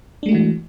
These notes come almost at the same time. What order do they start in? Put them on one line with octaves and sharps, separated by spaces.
D4 G#3 A3 F#4 E3